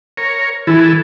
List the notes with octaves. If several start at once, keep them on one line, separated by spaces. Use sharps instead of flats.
A#4 C#5
E3 E4 G#4 A4